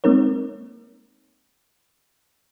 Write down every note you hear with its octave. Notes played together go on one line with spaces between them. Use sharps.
G#3 A#3 C4 D#4 A#4 C#5